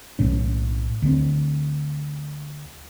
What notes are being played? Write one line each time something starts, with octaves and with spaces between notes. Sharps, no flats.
B1 A2 C#4
D2 C4